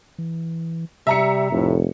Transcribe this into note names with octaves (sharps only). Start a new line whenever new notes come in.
E3
C3 G3 E5 A#5 C#7
F1 A2